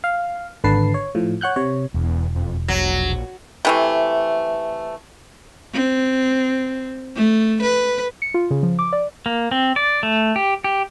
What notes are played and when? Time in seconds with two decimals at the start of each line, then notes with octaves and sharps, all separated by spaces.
0.04 F5
0.64 G#1 D3 B4 A5 C7
0.94 C#5
1.15 A2 F3
1.41 C#5 F#5 F#6 G6
1.56 C3 C#5
1.94 E1 E2
2.35 F2
2.68 A#1 F#3
3.65 C3 E3 A3
5.74 C4
7.16 A3
7.62 B4
8.22 C#7
8.34 F4
8.51 C#3
8.63 F3
8.79 D6
8.93 D5
9.26 A#3
9.51 C4
9.76 D5
10.03 A3
10.36 G4
10.64 G4